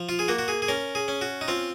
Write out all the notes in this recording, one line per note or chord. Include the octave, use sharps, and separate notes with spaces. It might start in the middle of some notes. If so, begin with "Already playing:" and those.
Already playing: F3
F4
G#4
A#3 F#4
F#4
G#4
G#4
C#4 A#4
G#4
C#4
F#4
D#4
C4 F4